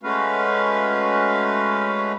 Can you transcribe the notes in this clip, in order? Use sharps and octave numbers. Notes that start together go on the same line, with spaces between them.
G#3 A3 C#4 F#4 B4 F5